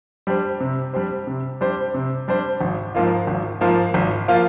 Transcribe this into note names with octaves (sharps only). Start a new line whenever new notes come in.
G3 D4 G4 C5
C3
G3 D4 G4 C5
C3
G3 D4 G4 C5
C3
G3 D4 G4 C5
G#1
G#2 F3 A#3 F4
G#1
G#2 F3 A#3 F4
G#1
F3 A#3 F4